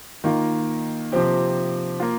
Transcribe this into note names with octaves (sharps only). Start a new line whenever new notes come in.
D#3 A#3 F4
C3 F3 C4 G4
A#3 F4